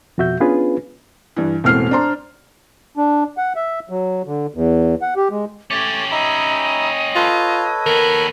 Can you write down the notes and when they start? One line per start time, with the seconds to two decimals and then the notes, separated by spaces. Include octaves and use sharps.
0.18 F2 B2 F#4 E5 G6
0.40 B3 C#4 D4 F4 G#4 B4
1.36 G2 E3
1.64 E1 A2 B3 C4 F6 C7
1.91 D4 C5 A#5 C6
2.97 D4
3.38 F#5
3.56 E5
3.89 F#3
4.26 D3
4.54 E2
5.02 F#5
5.16 G4
5.30 G#3
5.71 A3 C#4 G4 C#5 D6 A6
6.11 D#4 D#5 E5 B5
7.16 F4 A4 B4 C#5
7.86 D#2 B3 A#4